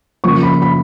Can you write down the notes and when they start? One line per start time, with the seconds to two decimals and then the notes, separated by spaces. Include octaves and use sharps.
0.24 C#3 F3 A#3 C#6
0.43 B5
0.62 B5